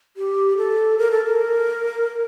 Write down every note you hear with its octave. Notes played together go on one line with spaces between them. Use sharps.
G4
A4
A#4
A4
A#4